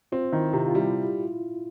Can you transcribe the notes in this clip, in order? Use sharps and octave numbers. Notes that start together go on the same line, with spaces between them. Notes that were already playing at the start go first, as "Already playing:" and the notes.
C4 F4
D#3 E4
C3 F4
F4
G3 E4